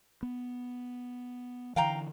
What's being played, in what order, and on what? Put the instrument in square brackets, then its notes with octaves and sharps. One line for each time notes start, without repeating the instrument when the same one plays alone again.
[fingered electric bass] B3
[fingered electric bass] D3 E3 [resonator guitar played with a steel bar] F5 G5 A#5